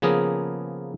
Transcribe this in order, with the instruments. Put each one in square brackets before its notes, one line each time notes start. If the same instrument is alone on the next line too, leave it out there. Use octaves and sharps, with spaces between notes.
[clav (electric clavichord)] C#3 F3 A#3 B3 G#4 A#4